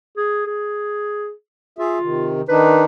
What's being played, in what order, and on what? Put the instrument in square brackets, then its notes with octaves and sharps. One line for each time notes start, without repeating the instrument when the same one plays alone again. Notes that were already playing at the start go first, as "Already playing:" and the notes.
[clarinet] G#4
G#4
[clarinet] F4 [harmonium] G#4 E5
[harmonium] C3 D#3
[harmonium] D#3 D4 D#4 [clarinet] B4